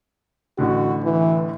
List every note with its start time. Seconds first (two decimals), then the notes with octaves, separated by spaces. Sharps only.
0.58 A1 A2 D3 F#4
1.03 E3